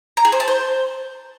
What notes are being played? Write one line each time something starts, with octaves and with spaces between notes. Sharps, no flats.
A#5
G#4
C5
A5
C5